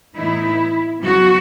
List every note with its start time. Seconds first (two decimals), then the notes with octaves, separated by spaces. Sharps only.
0.15 A2 E3 B3 D#4 E4
1.01 C#3 F#3 B3 F#4